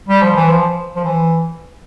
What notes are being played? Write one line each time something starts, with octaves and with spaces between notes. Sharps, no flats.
G3
F3
E3
F3
F3
E3